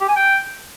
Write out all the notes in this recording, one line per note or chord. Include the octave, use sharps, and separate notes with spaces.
G4
G#5
G5